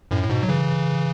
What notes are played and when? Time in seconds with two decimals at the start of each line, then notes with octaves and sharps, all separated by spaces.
0.11 F#2 A2
0.24 A2
0.29 G#2 B2
0.43 F#3
0.48 C#3 E3